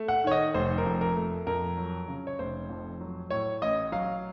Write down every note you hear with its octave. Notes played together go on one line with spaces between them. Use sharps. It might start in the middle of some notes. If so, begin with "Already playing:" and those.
Already playing: A3
F#5
D#3 C#5
D#5
F1 C5
A#4
F2
A#4
A3
F2 A#4
F#3
C#3
C#5
F1 C5
F2
F#3
A2 C#5
A1 D#5
F#3 F5